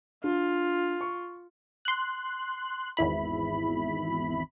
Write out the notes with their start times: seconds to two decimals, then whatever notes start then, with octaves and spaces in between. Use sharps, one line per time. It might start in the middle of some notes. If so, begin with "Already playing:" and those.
0.24 D4 F4
1.01 C#6
1.85 C6 F#6
2.97 G#1 E2 E4 B5